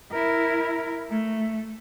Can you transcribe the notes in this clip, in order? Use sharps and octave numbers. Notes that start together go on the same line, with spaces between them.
E4 A#4
A3